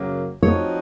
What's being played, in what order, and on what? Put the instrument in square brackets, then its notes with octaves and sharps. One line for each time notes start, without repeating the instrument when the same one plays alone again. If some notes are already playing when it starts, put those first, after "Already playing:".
Already playing: [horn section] F#2 C#3 F#3 A#3
[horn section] F3 C4 D#4 F#4 [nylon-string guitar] C#5